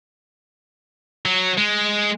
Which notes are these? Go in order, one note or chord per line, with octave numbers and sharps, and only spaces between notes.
F#3
G#3